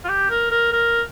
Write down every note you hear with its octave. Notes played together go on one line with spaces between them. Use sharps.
F4
G4
A#4
A#4
A#4